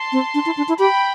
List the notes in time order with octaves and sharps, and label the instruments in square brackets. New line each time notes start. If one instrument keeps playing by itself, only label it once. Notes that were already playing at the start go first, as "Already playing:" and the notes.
Already playing: [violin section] A5 C6
[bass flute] C4
D4
E4
D4
E4
[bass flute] G4 [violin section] G5 B5